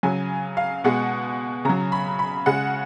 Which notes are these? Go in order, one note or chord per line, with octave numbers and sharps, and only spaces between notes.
C#3 F#3 G#5
F5
B2 G#3 F#5
C#3 F#3 A#5
B5
B5
C#3 G#3 F#5